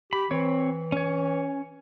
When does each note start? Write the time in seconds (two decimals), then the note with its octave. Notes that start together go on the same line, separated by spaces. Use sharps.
0.13 G4 B5
0.31 E3 C4 C#5
0.92 C#4 C#5